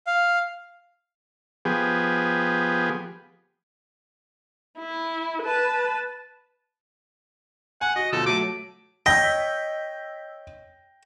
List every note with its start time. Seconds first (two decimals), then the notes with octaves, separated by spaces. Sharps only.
0.07 F5
1.65 F3 B3 G4 G#4
4.79 E4
5.42 B4 A5
7.81 F#5 G#5
7.96 F#4 D#5
8.12 D2 B2 F3 A4
8.26 F#3 A3 D6 D#7
9.06 C#5 D#5 G5 E6 G6 A#6 B6